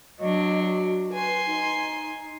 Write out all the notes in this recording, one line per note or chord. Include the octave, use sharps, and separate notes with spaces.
F#3 D4 D#5
F#4
B4 G#5 C6
D#4